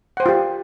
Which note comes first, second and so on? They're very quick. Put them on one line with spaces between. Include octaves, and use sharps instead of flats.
F#5 C5 G5 F4 G4